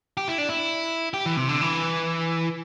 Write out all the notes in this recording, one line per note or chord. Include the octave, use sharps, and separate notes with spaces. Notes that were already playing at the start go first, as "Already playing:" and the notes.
G4
E4
D4
E4
G4
E3
C3
D3
E3